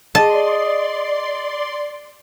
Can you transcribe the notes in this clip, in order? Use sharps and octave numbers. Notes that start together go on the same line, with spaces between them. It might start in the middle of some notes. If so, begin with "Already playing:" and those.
G#4 D5 D#5 G5 A5 C6